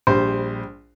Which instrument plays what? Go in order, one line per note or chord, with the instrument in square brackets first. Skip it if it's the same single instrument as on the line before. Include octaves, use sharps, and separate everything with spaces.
[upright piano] A#1 G3 [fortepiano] C5